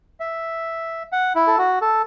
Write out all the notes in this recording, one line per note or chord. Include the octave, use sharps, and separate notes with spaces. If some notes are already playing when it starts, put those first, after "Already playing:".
E5
F#5
E4
A4
F#4
A4